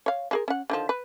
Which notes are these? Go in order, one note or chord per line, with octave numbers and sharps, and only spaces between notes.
C#5 F5
F3 G#4 A#4
C#4 F#5
D3 D#3 F3
B4